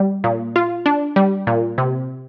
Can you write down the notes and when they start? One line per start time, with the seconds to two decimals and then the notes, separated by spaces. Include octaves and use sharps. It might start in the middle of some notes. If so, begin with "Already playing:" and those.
Already playing: G3
0.24 A#2
0.56 F4
0.86 D4
1.16 G3
1.47 A#2
1.78 C3